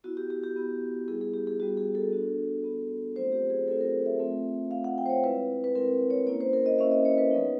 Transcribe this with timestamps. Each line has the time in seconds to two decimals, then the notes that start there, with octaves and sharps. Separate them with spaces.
0.04 B3 E4 F#4
0.17 G4
0.30 G4
0.44 G4
0.56 B3 E4
1.08 G3 B3 E4 G#4
1.21 G#4
1.34 G4
1.47 G#4
1.60 G3 B3 E4 F#4
1.77 G#4
1.95 A4
2.11 B3 D4 F#4
2.64 B3 D4 F#4
3.16 F#3 A3 C4 F4 C5
3.32 G4
3.50 G#4
3.67 F#3 A3 C4 F4 A4
3.81 A#4
4.06 E5
4.20 A3 C4 F4
4.71 A3 C4 F4 F5
4.84 F#5
4.98 G5
5.06 C5
5.10 C#5
5.24 G#3 C4 E4 B4
5.64 B4
5.75 G#3 C4 E4 A#4
6.10 C#5
6.27 A#3 C#4 E4 C#5
6.41 C5
6.53 A#4
6.66 D#5
6.79 A#3 C#4 E4 E5
6.91 D#5
7.05 C#5
7.18 B4
7.31 F#3 B3 D#4